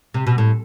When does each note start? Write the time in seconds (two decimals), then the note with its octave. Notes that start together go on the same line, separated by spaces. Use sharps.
0.14 C3
0.27 B2
0.38 A2